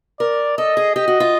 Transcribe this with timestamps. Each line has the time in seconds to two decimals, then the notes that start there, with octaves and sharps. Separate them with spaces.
0.20 A#4 D5
0.58 A4 D#5
0.77 G#4
0.95 G4 D#5
1.08 F#4
1.20 F4